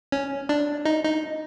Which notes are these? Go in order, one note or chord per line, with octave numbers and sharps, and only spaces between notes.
C#4
D4
D#4
D#4